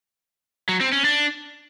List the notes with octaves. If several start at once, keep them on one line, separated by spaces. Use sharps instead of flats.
F#3
C4
C#4
D4